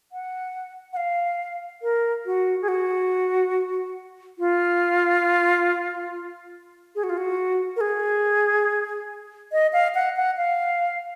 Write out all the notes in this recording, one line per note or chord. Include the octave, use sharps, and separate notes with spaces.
F#5
F#5
F5
A#4
F#4
G#4
F#4
F4
G#4
F#4
F4
F#4
A#4
G#4
D#5
F5
F#5
F#5
F5